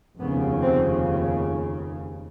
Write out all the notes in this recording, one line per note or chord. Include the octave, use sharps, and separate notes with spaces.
F1 D#2 C#3 B3
C4